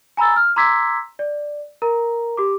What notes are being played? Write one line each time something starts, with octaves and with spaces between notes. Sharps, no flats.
G#5 A#5 B5 E6 A6
F6
A#5 C6 D6 E6 G#6 B6
D5
A#4 A#5
G4 D6